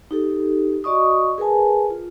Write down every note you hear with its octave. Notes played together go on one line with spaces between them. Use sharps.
D#4 G4 A4
F#4 D5 D#5 C#6 D#6
G#4 A#4 B4 G#5 A5
F4